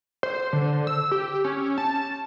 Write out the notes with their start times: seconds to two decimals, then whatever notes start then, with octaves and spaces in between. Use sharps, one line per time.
0.23 C5
0.53 D3
0.87 E6
1.12 G4
1.45 C#4
1.78 A5